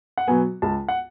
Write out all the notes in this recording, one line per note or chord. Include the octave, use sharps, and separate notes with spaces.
F#5
B2 F#3 B3 G#5
C#2 A5
F#5